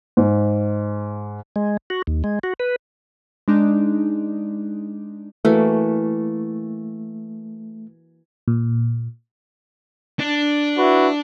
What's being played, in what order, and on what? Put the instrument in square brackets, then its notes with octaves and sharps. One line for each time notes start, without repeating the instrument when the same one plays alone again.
[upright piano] G#2
[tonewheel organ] G#3
F#4
D#2
G#3
F#4
B4
[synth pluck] G#3 D4 D#4
[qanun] E3 A#3 F#4 [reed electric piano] A3
[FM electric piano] A#2
[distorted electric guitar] D4
[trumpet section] E4 F#4 B4